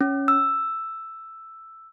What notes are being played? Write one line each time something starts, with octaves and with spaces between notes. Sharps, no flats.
C#4
E6